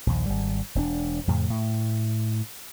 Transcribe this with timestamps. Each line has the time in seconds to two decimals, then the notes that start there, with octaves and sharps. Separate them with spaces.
0.07 A#1 D#2
0.26 G#1 G3
0.75 E1 C4 D4
1.27 F2 A2 C#3
1.50 A2